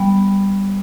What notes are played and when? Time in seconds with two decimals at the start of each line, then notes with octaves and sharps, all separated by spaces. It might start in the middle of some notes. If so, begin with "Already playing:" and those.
Already playing: G3 B3